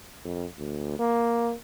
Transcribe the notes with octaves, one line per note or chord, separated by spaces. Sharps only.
F2
D2
A#3